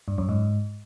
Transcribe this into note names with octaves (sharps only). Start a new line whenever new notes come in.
G2
F#2
G#2